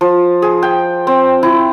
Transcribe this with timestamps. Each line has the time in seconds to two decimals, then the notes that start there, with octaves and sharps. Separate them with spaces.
0.01 F3
0.42 G#4
0.63 G5
1.07 C4
1.43 E4